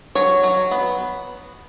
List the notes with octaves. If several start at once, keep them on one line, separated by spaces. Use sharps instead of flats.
F#3 C#5
F#3
B3